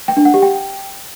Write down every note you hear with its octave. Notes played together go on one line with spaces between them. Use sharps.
G5
D4
F#5
G4
G5